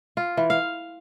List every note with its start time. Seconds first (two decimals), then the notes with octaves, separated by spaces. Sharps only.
0.17 F4
0.37 E3
0.50 F5